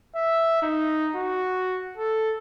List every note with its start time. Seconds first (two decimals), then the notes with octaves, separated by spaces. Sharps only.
0.16 E5
0.62 D#4
1.16 F#4
1.97 A4